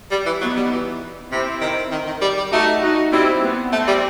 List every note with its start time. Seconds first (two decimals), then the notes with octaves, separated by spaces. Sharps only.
0.11 G3
0.26 E3
0.41 F#3 B3 D#4
0.57 G3
0.72 E3
1.32 C3 C4 E4
1.61 D#3
1.92 D#3
2.07 D#3
2.22 G3
2.37 G3
2.52 A3 D#4 F#4
2.82 D#4 F#4
3.12 G3 C4 E4
3.43 B3
3.73 A3 C4
3.88 G3